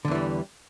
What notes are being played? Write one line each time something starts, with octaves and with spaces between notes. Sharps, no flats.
E2 D3 E3 G3